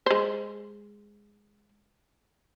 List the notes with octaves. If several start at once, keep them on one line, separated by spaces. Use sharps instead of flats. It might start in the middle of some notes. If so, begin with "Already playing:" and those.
G#3 C5